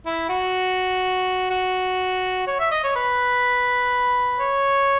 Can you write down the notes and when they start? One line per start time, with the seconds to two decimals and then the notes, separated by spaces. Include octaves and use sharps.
0.06 E4
0.29 F#4
1.50 F#4
2.47 C#5
2.60 E5
2.71 D#5
2.84 C#5
2.96 B4
4.40 C#5